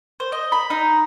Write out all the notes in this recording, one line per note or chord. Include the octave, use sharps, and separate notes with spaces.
C5
D#5
B5
D#4